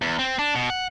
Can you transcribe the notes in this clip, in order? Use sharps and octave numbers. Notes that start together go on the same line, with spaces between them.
E2
C4
D4
B2
F#5